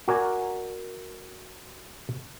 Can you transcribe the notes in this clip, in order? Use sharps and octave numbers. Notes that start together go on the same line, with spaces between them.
F#4 A#4 D5 G#5